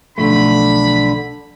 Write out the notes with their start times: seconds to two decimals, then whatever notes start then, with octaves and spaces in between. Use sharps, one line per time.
0.18 B1 D3 F3 A3 B5